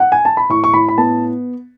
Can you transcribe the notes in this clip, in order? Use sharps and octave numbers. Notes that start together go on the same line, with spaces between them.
F#5
G#5
A5
B5
A2 C#6
C#6
A2 B5
B5
B3 A5